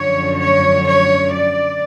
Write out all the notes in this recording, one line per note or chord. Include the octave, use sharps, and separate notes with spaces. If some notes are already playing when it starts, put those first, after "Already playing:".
Already playing: F#2 D3 F3 C#5
C#5
C#5
D5